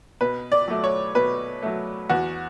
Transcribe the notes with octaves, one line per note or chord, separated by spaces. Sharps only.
B2 B4
D5
F#3 A3
C#5
B2 B4
F#3 A3
E2 F#4